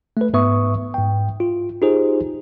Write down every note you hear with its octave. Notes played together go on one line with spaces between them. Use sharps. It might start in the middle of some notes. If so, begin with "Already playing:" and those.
A3 B4
G#2 B3 B4 E5 C#6 D#6
G#2 G5
F4
D#4 F4 G4 G#4 C5